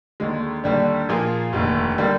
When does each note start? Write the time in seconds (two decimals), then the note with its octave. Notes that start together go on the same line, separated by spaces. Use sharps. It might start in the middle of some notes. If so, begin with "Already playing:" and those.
0.20 D#2 D3 G#3
0.64 D#2 D3 G3 D4
1.09 A#2 F3 A#3 F4 G#4
1.53 F1 D#2 D3
1.98 D3 G3 A#3